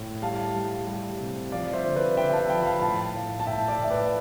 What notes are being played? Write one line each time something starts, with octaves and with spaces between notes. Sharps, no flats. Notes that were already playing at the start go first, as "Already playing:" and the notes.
Already playing: A2
G3 F5 A5
G3
G3
C3
F3 D5 F5
C5 E5
D3
B4 D5
D3 E5 G5
G5
F5 A5
F3 G5 B5
B5
F5 A5
A2 F5 A5
A2
A5
A2 E5 G5
E5
D5 F5
A2
E5
B4 D5